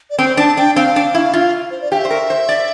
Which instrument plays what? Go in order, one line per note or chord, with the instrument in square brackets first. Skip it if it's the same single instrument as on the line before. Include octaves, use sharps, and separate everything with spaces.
[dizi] D5
[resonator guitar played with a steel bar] C4 [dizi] C5
[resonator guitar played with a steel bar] D4 [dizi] A5
[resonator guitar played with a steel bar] D4 [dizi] G5
[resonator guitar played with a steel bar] C4 [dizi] F5
[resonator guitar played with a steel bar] D4
E4
F4
[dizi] C5
D5
[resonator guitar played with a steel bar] G4 [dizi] F5
[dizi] E5
[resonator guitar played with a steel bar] C5
A#4
C5
D5